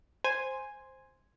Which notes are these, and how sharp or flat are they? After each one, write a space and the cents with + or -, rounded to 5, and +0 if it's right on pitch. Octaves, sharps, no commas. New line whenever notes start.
C5 +0 G#5 -5